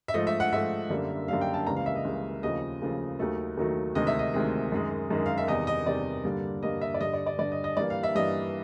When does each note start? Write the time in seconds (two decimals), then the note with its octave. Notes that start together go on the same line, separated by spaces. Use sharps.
0.08 E5
0.14 G#2 F3 A3 D#5
0.27 E5
0.40 F#5
0.52 G#2 F3 A3 E5
0.90 F#2 D3 G3 A#3
1.28 F#2 D3 G3 A#3 F5
1.41 G5
1.54 A5
1.67 C#2 C#3 E3 G3 A#3 A#5
1.76 F5
1.86 E5
1.96 D#5
2.05 C#2 C#3 E3 G3 A#3
2.43 D#2 C#3 F3 A3 D#5
2.81 D#2 C#3 F3 A3
3.19 D#2 D#3 F#3 A3
3.57 D#2 D#3 F#3 A3
3.95 D2 C3 D#3 G#3 D#5
4.07 E5
4.19 D#5
4.34 D2 C3 D#3 G#3
4.72 F#2 D#3 G#3
5.10 F#2 D#3 G#3
5.26 F5
5.38 E5
5.48 E2 C3 D#3 G3 D#5
5.67 D#5
5.86 E2 C3 D#3 G3 D5
6.25 G2 D3 G3 A#3
6.63 G2 D3 G3 A#3 D#5
6.81 E5
6.94 D5
7.00 G2 D3 G3 D#5
7.13 D5
7.26 D5
7.39 G2 D3 G3 D5
7.52 D#5
7.64 D#5
7.77 G2 E3 G3 A#3 D5
7.90 F5
8.03 E5
8.15 G2 E3 G3 A#3 D#5